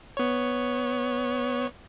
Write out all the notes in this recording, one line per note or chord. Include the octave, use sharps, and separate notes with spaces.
B3 C#5